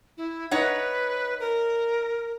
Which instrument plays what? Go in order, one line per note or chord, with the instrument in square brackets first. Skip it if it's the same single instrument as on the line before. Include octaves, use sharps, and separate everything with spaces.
[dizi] E4
[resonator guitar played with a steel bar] D#4 C#5 F#5 [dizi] B4
[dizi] A#4